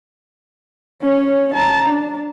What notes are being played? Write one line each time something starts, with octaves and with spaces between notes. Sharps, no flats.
C#4 C#5
A5 A#5
D4